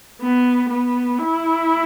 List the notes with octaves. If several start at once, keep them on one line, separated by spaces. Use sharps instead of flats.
B3
B3
E4